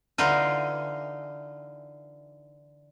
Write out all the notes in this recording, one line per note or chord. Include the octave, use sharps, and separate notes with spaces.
D3 E3 D#4 F4